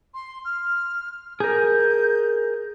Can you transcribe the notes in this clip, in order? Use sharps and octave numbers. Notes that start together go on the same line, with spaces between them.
C6
F6
G#4 A#4 G6